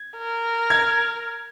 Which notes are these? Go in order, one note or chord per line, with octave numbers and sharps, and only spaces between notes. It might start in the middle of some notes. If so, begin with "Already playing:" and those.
Already playing: G#6
A#4
G#6